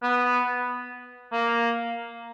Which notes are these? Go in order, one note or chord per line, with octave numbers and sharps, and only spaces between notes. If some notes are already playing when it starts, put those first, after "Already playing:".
B3
A#3